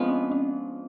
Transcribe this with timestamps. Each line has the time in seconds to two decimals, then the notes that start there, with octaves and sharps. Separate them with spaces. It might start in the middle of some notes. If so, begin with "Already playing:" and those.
Already playing: F3 G#3 B3 C4 D4
0.09 C#4
0.32 C#4